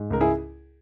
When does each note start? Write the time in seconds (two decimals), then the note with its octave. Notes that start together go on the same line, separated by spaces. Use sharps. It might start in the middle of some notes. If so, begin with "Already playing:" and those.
Already playing: G#2
0.10 C#2 A#4
0.21 E4 G#4